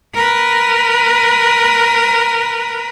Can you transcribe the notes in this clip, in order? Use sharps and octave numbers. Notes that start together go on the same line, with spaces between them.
A#4 B4